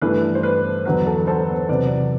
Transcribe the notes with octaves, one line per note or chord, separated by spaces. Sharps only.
G2 E3 A3 B4
C5
B4
E2 D3 F#3 B3 B4
A4
A4 C5
E2 C3 F#3 C4 B4 D5